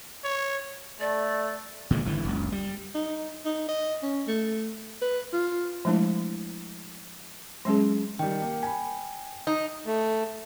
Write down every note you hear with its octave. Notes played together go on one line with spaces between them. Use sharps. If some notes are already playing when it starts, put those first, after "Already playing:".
C#5
A3 D5
A#2 D3 D#3 G#3
G#1 D3 E3
F#1 C#2
G3
D#4
D#4
D#5
C#4
A3
B4
F4
F3 G#3 A3 D4 E4
F#3 G#3 C#4 G#4
D#3 G3 G5
A#3
G#5 B5
D#4
A3